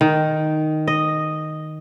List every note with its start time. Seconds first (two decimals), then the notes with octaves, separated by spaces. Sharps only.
0.01 D#3
0.88 D#5